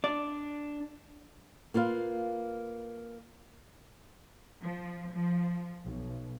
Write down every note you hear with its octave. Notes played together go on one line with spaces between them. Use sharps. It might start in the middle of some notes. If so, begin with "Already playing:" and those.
D4 D5
A#3 F4 B4 F5
F3
F3
B1